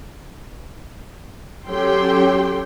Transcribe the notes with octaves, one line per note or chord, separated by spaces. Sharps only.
F#3 C#4 G4 A4 G5 C6